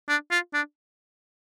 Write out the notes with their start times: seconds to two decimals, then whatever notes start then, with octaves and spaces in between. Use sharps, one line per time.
0.09 D4
0.31 F4
0.54 D4